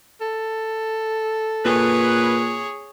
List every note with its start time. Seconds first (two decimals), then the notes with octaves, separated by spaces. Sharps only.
0.21 A4
1.65 A#2 G#4 B4 C#5